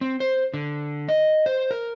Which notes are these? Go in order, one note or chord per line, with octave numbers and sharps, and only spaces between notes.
C4
C5
D3
D#5
C5
A#4